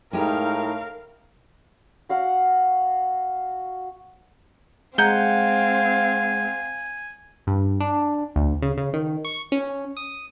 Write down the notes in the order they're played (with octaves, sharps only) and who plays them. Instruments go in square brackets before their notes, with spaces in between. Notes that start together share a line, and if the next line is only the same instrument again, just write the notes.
[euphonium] A2 [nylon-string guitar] G#3 G4 [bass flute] D#4 [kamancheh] A#4 F5
[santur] F#4 F5 F#5
[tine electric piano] G#3 F#5 [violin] C4 F5 [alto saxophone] G#5 [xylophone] A#5 G6 G7
[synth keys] G2
D4
D2
C#3
C#3
D#3
C#6
C#4
D#6